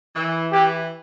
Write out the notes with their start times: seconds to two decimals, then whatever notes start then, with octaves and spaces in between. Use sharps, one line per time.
0.16 E3
0.53 E3 G4